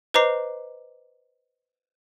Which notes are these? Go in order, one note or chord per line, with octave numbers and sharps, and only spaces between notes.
B4 C5 D#5 A#5 D6 C7